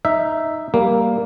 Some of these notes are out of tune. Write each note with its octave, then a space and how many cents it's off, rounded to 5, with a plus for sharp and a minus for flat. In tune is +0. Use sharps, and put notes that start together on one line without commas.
D#4 +0 E5 +0
G3 +0 A#3 +0